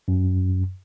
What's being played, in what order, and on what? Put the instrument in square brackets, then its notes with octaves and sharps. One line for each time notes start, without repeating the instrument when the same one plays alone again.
[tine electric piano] F#2